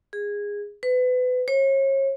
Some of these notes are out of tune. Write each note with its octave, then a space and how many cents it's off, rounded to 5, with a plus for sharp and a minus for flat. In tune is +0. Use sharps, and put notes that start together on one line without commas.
G#4 -15
B4 +30
C#5 -35